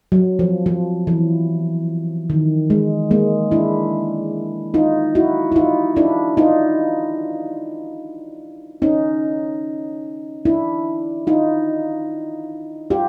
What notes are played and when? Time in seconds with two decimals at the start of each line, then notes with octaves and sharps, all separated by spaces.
0.12 F#3
0.39 F3
0.66 F3
1.07 E3
2.30 D#3
2.70 G#3
3.11 G#3 A#3
3.51 D4 E4
4.74 D#4 F4
5.15 E4 F#4
5.52 E4
5.56 D#4 F4
5.96 D4 E4
6.37 D#4 F4
8.82 C#4 D#4
10.45 D4 E4
11.27 D#4 F4
12.90 F4 G4